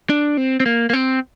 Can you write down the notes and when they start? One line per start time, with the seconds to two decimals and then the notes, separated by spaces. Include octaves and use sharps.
0.10 D4
0.37 C4
0.60 C4
0.66 A#3
0.90 A#3
0.93 C4